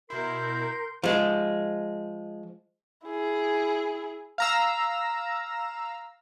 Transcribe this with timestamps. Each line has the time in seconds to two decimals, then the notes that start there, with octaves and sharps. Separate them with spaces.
0.10 B2 E4 A#4 C6 G6
1.04 F3 G#3
3.06 E4 G#4
4.38 F5 A#5 E6